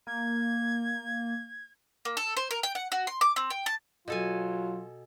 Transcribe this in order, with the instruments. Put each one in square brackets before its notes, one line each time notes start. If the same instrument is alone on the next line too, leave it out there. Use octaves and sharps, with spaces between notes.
[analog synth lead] A#3 [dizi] G#6
[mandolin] A#3
A4
C5
A#4
G5
F#5
F#4
C6
D6
C4
G5
A5
[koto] B2 A4 G#5 [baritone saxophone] F#3 [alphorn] F4